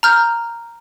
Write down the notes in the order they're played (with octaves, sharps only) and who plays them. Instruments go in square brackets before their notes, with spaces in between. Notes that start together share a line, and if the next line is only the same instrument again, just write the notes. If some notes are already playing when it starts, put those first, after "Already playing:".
[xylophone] A#5 F6 G6